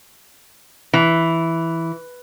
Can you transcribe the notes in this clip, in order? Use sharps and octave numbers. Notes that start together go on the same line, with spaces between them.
E3